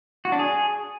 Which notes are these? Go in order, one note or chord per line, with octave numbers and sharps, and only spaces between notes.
F#4
D4
G#4